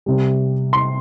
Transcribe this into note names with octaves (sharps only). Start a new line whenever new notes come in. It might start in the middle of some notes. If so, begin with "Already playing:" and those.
C3 G3
C6